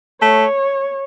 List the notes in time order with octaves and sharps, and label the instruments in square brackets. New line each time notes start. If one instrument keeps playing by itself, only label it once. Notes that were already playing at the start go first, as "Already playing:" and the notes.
[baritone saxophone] A3 [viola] C#5